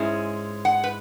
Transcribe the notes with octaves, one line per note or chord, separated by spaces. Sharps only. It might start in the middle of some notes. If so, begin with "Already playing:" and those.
Already playing: G#2 G#3 C#4 E4
F#5
B4